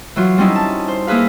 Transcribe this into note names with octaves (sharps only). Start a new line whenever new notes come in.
E3 F#3 F4
G3 C4 C#4 D#4 E4
A5
C5
A#3 E4 G#4 B4 F5